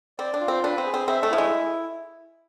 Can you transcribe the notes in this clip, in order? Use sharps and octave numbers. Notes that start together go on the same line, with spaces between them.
C4 D5
D4
F4
C4
D4 B4
C4
G#4
C4
C4 E5
A3
F3 E4
G#3